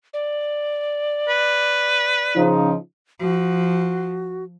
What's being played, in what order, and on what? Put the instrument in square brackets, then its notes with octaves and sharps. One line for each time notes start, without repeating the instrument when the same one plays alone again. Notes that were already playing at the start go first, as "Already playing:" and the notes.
[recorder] D5
[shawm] B4
[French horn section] C#3 F3 D#4
[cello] F3 [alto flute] F#4